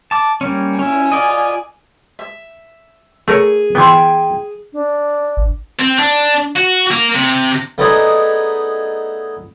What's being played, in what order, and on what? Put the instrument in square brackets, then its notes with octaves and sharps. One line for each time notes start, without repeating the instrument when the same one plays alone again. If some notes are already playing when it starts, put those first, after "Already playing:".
[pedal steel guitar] A5 D6
G3 A#3 C#4
[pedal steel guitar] C#4 E4 [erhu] G#5
[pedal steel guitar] F4 D5 D#5
[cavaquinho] E5
[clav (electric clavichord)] A3 A#4 C#5 [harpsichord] G#4
[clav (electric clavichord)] E3 B3 [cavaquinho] G5 G#5 C6
[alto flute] D4
[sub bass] A1
[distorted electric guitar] C4
D4
F#4
A#3
C3
[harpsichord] A3 B3 D4 D#4 G#4 B4